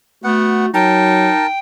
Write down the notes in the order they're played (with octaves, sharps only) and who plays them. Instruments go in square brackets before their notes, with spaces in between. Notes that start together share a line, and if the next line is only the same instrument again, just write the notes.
[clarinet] A3 [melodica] B3 F#5 [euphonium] F#4
[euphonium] F#3 [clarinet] D#4 [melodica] A#4 A5 [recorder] G5